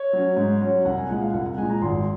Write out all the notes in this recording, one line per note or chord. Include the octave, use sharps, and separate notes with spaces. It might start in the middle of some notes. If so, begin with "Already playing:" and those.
Already playing: C#5
F#3 C#4
G#2
F#3 C#4
C2 F#5
G#5
A#2 F3 G#3 F#5
F5
C2 F#5
F#5
A#2 F3 G#3 G#5
A#5
G#1 C6